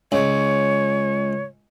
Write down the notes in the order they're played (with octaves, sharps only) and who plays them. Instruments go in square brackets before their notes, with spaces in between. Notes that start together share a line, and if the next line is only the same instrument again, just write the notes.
[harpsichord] C#2 [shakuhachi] C#5